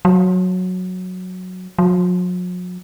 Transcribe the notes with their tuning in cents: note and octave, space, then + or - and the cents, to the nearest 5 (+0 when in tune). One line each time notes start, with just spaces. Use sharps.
F#3 -10
F#3 -45